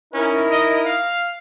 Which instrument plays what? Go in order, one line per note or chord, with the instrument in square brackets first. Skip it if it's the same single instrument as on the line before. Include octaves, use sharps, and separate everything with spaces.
[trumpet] C#4 [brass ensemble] D#4 E4 A#4
[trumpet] D#5
F5